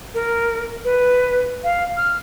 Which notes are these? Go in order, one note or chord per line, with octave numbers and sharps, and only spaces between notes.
A#4
B4
F5
F6